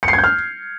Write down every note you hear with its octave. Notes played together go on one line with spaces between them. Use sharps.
C#7
C7
G#6
G6
F6